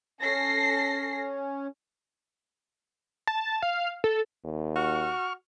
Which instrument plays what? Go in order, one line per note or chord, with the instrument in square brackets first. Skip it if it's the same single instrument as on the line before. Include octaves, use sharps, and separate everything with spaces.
[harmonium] C#4 [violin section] A4 A#6 C7
[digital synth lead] A5
F5
A4
[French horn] D#2
[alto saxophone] F#4 [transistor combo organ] C#6 F6